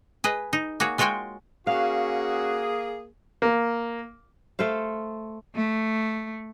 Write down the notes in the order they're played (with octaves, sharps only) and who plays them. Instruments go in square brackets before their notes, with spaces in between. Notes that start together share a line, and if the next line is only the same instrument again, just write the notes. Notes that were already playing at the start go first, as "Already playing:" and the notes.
[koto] G#4 B4 D#5
D#4
A#3 F#4 G#4 C#5
G#3 F4 F#4 C#5 G5 G#5
[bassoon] A#3 [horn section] C#4 F#4 [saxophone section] G#4 [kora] F5
[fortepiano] A#3
[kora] A3 A4 C5 F5
[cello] A3